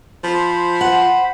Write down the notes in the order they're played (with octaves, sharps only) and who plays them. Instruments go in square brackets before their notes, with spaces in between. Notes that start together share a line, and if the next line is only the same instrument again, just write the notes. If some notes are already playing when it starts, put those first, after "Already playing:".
[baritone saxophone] F3 [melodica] C5 B5
[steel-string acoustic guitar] F#5